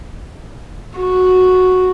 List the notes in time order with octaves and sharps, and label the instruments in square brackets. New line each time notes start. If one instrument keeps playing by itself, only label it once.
[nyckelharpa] F#4